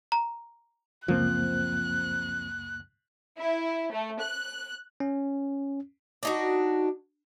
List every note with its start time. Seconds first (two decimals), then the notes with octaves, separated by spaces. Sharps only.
0.12 A#5
1.08 C#2 F#2 F3 A#3 C4 F#6
3.38 E4
3.91 A3
4.20 F#6
5.00 C#4
6.23 D4 D#4 F#4